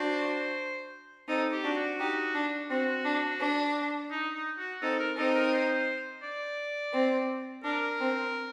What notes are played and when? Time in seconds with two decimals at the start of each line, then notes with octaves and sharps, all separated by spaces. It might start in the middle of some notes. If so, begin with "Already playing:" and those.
Already playing: D4 F#4 C5
1.28 C4 D#4 A4
1.52 G4
1.63 D4 F#4
1.76 F#4
1.99 D#4 G4
2.34 D4
2.70 C4 F#4
3.05 D4
3.41 D4
4.11 D#4
4.35 D#4
4.58 F#4
4.82 C4 D#4 A4
4.99 A#4
5.16 C4 D#4 A4
5.35 A#4
5.52 C5
6.23 D5
6.93 C4
7.64 D4 A#4
8.00 C4